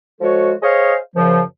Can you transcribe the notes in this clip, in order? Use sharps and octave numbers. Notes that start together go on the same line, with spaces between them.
F3 G#3 F#4 A4 C#5
G#4 C5 C#5 D#5 F5
F#2 C#3 F3